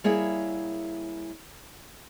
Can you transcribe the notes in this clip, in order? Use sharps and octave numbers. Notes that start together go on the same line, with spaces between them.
G3 A#3 E4 G#4 C#5 E5